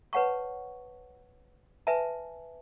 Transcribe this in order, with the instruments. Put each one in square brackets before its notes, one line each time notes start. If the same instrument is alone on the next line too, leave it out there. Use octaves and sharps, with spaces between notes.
[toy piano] B4 C#5 F#5 A5 C#6
B4 E5 G#5 A5